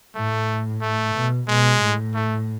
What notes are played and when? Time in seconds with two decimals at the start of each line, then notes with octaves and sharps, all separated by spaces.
0.15 A2 A3
0.82 A3
1.15 B2
1.48 B2 G#3
1.82 A2
2.14 A3